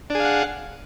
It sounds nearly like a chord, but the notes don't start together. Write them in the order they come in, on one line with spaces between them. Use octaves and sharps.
D4 G#4 F5 F#5